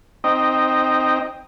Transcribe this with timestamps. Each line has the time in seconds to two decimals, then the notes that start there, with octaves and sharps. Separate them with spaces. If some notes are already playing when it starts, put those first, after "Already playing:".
0.24 C4 D#4 D#5 G5